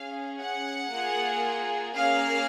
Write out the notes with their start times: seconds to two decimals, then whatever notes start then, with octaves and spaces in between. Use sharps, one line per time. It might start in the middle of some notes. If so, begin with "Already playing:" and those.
Already playing: C#4 G#4 F5
0.41 F#5
0.92 A#3 F4 G#4
1.96 A#3 C#4 G#4 F5